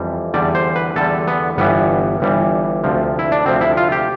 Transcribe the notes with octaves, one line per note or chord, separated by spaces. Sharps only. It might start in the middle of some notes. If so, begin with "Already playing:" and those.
Already playing: F2 E3 G3
E2 D3 G3 D5
C5
B4
E2 D3 G3 A4
B3
G1 G2 E3 G3 B3
G1 G2 E3 G3
D2 C3 F3
E4
D4
D2 C3 F3 C4
E4
F4
G4